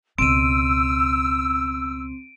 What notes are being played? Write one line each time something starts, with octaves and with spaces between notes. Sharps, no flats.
C#2 B2 C4 E6 D7 D#7